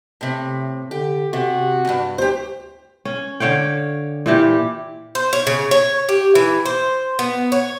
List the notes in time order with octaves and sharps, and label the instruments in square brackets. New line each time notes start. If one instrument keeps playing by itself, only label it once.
[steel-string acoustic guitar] A2 C3
[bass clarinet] D3 [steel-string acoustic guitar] G4
[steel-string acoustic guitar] C3 [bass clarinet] F#4
[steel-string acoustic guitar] E2 G2
[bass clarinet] D2 [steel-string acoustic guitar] G4 C5
[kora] C#4
D3 C#5 F5 G5
A#2 E3 G4
[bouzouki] C5
C#5
C#3
C#5
G4
E3
C5
B3
C#5